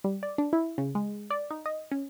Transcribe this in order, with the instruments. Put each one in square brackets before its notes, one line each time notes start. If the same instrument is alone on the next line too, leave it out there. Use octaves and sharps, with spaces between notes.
[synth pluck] G3
D5
D4
E4
C#3
G#3
D5
D#4
D#5
C#4